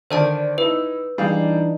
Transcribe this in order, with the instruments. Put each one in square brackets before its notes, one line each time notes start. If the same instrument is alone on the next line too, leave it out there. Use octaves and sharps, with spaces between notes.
[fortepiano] D3 D#3 [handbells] C5 D5 A5
[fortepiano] D#4 E4 [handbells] B4
[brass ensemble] E3 D4 D#4 [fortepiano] G3 G#4 F5